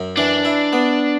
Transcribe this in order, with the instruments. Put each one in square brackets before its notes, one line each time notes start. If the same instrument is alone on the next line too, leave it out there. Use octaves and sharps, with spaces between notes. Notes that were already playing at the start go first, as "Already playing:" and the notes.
Already playing: [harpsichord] F#2
[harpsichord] E3 [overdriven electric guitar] D4
[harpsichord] E4
B3